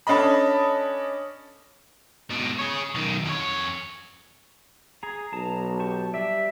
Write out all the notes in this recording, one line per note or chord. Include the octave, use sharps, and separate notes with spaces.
C#4 D4 A4 D#5 B5
G#2 B2
G#4 C#5
B1 D#3
F2 C#5
G#4 A#5
B1 A5 A#5
G4 A5 C#6
G3 D5 E5